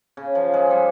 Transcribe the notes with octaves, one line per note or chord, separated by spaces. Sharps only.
C#3
F3
G#3
G3